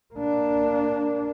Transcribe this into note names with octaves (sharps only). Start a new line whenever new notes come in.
A#3 D4